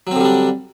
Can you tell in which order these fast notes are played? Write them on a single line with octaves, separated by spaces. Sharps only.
F#3 C4 D3 G3 D4